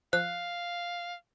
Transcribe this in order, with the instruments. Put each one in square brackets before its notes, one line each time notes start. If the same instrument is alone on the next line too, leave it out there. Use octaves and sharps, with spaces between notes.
[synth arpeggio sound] F3 [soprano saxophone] F5 [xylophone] F#6